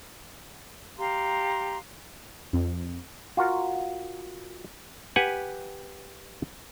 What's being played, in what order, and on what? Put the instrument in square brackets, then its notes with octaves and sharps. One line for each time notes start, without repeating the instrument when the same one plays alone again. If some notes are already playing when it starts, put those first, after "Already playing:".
[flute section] G4 F5 A#5 C6
[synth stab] F2
[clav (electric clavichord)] F4 F#4 A#4
G4 B4 F#5 G#5